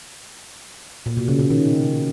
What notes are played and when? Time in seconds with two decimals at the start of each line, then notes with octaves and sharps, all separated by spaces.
1.06 A#2
1.17 B2
1.28 C#3
1.39 C#3
1.50 D#3